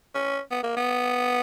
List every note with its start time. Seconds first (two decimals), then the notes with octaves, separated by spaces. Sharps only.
0.15 C#4
0.51 B3
0.63 A#3
0.77 B3